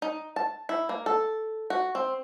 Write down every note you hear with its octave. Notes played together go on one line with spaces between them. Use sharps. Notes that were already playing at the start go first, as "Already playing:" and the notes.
D#4
A5
E4
A#3
A4
F#4
C4